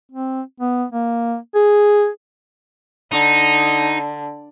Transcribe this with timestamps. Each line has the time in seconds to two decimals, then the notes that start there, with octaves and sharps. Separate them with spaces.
0.11 C4
0.60 B3
0.92 A#3
1.55 G#4
3.12 D3 D#4